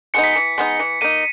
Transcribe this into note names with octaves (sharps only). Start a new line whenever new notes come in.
G#3 B3 D#4 C#7
B6
E3 C#7
G#3 B3 D#4
E3 C#7
A#3 D#4 D#7